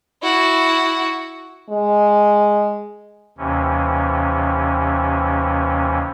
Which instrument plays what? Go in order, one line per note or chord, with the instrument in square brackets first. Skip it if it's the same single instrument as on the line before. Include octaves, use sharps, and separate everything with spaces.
[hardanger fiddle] E4 F#4
[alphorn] G#3
[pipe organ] D#2 C3 E3 C#4